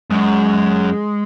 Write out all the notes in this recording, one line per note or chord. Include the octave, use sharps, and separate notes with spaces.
F#2 G#3